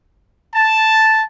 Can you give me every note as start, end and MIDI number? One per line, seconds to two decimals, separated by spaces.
0.54 1.23 81